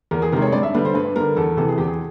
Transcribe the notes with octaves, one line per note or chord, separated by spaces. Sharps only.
E2 A#4
G#4
C3 D#3 G#3 A#4
C#5
G2 D5
E5
D3 G3 B4
C5
G2 B4
D3 G3 A#4
E2 A4
C3 E3 A4
G#4
E2 G4
G#4